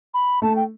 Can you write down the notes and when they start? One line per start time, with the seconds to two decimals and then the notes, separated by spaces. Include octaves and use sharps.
0.14 B5
0.42 A3 A5
0.56 G5